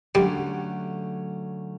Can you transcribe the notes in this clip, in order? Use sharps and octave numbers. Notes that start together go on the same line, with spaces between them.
D3 F#3 G3 A3 C#4